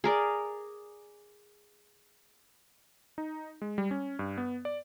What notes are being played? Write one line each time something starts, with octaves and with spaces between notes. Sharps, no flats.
G#4 A#4 D5
D#4
G#3
G3
C#4
G2
B3
D5